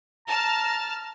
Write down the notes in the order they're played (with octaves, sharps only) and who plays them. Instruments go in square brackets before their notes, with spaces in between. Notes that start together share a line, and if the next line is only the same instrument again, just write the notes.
[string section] A5 F6 [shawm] A#5